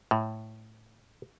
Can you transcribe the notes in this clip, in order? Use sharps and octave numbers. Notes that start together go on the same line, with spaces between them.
A2